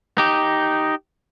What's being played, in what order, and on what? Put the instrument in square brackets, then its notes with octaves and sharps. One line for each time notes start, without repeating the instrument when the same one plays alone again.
[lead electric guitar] D#4 G4